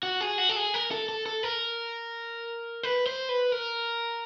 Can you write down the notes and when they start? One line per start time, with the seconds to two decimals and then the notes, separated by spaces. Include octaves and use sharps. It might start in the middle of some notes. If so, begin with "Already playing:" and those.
0.03 F#4
0.21 G#4
0.38 F#4
0.49 A4
0.56 G#4
0.74 A#4
0.91 A4
1.09 A4
1.26 A4
1.43 A#4
2.83 B4
3.06 C5
3.29 B4
3.52 A#4